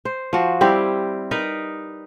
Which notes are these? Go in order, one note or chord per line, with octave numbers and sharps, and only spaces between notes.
C5
F3 F#4
G3 C4 E4 G4
D#4 A#4 B4